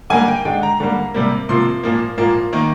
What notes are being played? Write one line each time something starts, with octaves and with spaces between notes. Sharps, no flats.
D3 G3 A#3 G#5
G5
D3 G#3 G5
A#5
D3 G3 A#3
C3 G3 A#3
C3 F3 A#3 C6
A#2 F3 A#3
A#2 F3 A#3
D#3 A#3